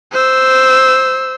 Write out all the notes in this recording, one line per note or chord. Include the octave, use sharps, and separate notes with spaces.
C5 E6